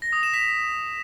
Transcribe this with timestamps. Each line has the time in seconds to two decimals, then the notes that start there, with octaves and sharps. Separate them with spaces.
0.02 A#6
0.13 D#6
0.23 E7
0.34 B6